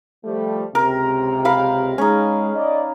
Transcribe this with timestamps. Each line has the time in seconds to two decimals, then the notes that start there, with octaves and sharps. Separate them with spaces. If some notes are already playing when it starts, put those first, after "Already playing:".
0.24 F3 G3 A3
0.75 C#2 C3 A#4
1.45 A#4 F5 B5
1.98 G#3 C#4 D#4
2.54 D5 D#5